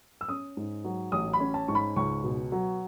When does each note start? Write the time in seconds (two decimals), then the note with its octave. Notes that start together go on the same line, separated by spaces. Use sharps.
0.21 E6
0.28 C#4 D#6
0.57 G#2
0.84 F#3
1.12 A1 D#6
1.33 B5
1.40 C#4
1.54 A5
1.68 G#2 C#6
1.75 B5
1.96 C#2 C#6
2.24 B2
2.52 F#3